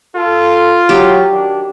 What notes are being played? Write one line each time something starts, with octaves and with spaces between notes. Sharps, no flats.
F4 A4
F#3 G4
D#3 F#3 D4